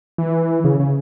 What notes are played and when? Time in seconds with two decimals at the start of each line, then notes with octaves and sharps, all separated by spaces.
0.18 E3
0.64 C#3
0.80 C#3